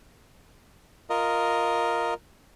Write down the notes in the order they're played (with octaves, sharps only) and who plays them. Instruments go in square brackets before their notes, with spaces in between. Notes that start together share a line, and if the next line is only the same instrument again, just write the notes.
[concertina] F4 A#4 D#5